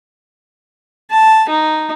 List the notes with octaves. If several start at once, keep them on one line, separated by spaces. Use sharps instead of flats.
A5
D#4